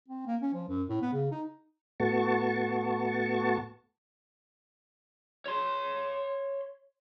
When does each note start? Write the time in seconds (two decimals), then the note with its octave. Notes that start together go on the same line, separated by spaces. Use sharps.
0.08 C4
0.27 A#3
0.42 C#4
0.54 F3
0.69 F#2
0.89 A2
1.02 B3
1.13 C#3
1.32 D#4
2.00 A2 A3 B3 F#4 A5 C#6
5.46 C#5 C6